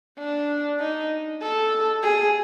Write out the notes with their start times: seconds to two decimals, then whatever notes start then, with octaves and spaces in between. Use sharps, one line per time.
0.19 D4
0.80 D#4
1.42 A4
2.03 G#4